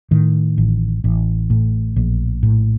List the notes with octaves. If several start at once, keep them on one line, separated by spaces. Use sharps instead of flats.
A2 D#3
A1
A1
A2
A#1
A2